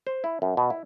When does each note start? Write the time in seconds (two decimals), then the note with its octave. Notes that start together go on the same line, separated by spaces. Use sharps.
0.07 C5
0.24 E4
0.42 F#2
0.57 B2
0.70 E4